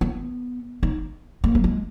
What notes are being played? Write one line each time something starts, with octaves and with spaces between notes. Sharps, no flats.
B3
D#4
A#3
F#3
G#3